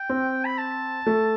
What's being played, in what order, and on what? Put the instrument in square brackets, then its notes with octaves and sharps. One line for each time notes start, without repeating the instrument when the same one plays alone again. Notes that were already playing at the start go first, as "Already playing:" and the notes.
Already playing: [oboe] G5
[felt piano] C4
[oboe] B5
A5
[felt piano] A3